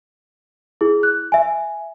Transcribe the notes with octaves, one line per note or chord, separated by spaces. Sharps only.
E4 G#4
F#6
E5 G#5